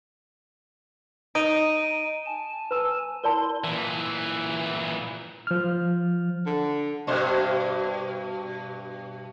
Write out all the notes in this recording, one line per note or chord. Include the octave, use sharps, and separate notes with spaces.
D#4 D7 D#7
G#5 A5
B4 B5 E6
E4 A#4 D5 A5 C6
A#2 E3
F3 F6
D3
G2 B2 C5